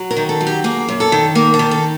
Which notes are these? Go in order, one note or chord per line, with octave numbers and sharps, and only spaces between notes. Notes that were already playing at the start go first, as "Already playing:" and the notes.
Already playing: F#3
A#4
D#3
A4
F#3
G4
A#3 G#4
F#2
A4
D#3
A#3 A#4
A4
D#3
A4